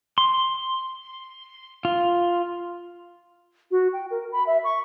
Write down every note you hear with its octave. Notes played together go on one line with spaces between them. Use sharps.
C6
F4
F#4
G5
A#4
B5
E5
C#6